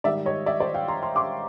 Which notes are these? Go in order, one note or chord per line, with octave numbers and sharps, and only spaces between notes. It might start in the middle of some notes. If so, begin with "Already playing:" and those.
G#2 D#3 G3 D5 E5
C#5 D#5
D5 E5
C5 D5
F5 G5
A#5 C6
A#5 C6
C6 D6